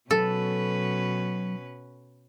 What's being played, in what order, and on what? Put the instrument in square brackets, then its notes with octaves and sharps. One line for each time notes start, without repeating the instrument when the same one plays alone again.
[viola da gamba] B2 C#4 B4 [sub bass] F#3 [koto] A4